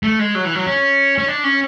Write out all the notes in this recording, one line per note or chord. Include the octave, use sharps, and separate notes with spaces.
A3
G#3
F#3
E3
F#3
C#4
C#4
D4
C#4